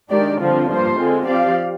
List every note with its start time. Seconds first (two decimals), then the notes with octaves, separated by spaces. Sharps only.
0.10 D#3 G#3 D4 G4 D5
0.39 G2 D3 F3 C4 F4
0.68 G2 F3 A#3 F4 C5
0.97 D3 G#3 C4 F4
1.27 F3 C4 G4 D5 F5